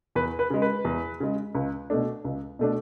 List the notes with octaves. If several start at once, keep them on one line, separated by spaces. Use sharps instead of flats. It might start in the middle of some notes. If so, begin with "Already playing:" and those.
E2 B4
B4
C#3 G#3
B4
E2
C#3 G#3
C#2
B2 A3 D4
C#2
B2 A3 D4